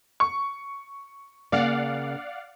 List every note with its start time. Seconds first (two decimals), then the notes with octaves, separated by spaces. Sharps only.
0.20 C#6
1.52 C#3 A#3 D5 F5 F#5